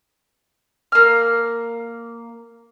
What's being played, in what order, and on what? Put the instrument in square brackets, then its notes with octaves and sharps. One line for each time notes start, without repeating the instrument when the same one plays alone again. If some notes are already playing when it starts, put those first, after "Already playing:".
[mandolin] A#3 F6